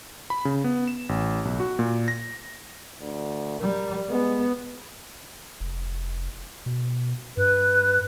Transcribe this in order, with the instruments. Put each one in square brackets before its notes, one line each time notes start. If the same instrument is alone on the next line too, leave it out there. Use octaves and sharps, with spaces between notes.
[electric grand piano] B5
C#3
B3
E7
A1
B1
F#4
A#2
A#6
[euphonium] D2
[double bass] G3 [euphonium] A#4
[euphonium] G#3 [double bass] B3
[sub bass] F1
B2
[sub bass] G2 [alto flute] B4